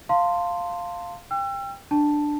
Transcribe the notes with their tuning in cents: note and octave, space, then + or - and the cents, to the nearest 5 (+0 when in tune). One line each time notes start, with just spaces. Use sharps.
F5 +0 A5 +40 C6 +0
G5 +20 E6 +40
D4 +10 A5 +0